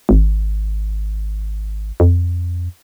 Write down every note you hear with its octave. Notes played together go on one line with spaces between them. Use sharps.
G#1
F2